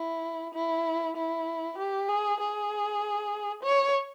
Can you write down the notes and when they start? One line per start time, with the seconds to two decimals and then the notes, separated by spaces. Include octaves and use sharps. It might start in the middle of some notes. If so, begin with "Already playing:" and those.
Already playing: E4
0.54 E4
1.17 E4
1.78 G4
2.09 G#4
2.40 G#4
3.64 C#5